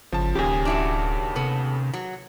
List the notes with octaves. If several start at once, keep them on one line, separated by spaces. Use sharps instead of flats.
G1 C#3 F3 A5
D1 D#2 C#3 G4 G#4
D4 E4 F#4
C3 B3 A4
F#3